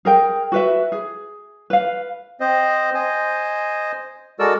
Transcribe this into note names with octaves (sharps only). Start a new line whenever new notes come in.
G#4 A#4 G5
F#4 B4 E5
G#4
B4 F5
C4 C5 D#5
C5 D#5 G#5
G#3 F#4 A4 A#4 D5 E6